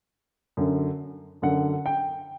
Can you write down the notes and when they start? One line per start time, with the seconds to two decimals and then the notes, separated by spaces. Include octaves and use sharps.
0.57 F#2 D3
1.42 F#2 D3 F#5
1.86 G5